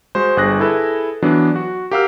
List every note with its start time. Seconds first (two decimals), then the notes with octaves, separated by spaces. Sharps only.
0.15 G#3 F#4 C5
0.37 G1 G#4 F#6 A#6
0.59 E4 G#4 A4 B4
1.22 E3 F#3 B3 D4
1.56 F#4
1.91 G4 A#4 F5 F#5 E6 F6